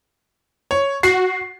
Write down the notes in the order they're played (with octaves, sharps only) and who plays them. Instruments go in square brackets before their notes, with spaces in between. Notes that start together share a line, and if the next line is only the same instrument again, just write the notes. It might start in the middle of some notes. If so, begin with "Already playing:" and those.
[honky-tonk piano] C#5
[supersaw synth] F#4 [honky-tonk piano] C7